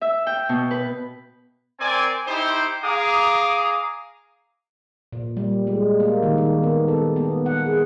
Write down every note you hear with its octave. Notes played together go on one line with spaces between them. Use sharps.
E5
G5
B2
B4
C4 A#4 D5 G#5
D#4 E4 G4 C5
G#4 F5 A#5 D6 D#6
A#2
G3
G#3
A#3
D#3
D#3
B3
A4
B3
F#5
G#4